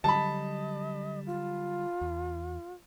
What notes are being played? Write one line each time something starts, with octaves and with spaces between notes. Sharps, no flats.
D3 F#3 G3 D#5 A5 B5
F4
E2